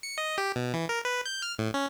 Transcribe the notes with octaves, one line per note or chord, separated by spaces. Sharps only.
C#7
D#5
G4
B2
E3
A#4
B4
G6
F6
A2
C#4